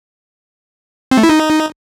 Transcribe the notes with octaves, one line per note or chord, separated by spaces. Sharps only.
C4
A3
E4
D#4